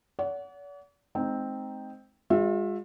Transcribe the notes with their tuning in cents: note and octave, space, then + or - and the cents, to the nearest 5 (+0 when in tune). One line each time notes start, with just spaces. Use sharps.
D5 -45 F#5 +0
G#3 +45 C4 +0 D#4 +0
G#3 -35 F4 +40 E5 +5